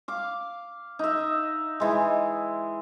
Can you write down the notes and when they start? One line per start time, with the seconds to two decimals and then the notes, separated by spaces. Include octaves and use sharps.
0.08 F5 D6
0.99 D#4 E5
1.80 E3 G#3